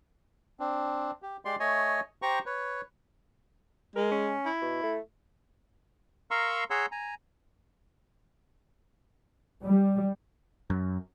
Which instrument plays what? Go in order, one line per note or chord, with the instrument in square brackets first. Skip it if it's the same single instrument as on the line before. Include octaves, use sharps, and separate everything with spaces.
[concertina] C4 D4
G4
G#3 G4 D5 C6
A3 C#5 D#5 G#5
G4 C5 G5 A#5 C#6
B4 C#5
[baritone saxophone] G#3 [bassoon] A#4
[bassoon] C#4
[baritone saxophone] E4
[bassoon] B2
A3
[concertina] A#4 F5 A#5 C6 C#6 E6
G#4 C#5 F#5 A#5 C6 E6
G#5 A#5
[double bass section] G3
[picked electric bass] F#2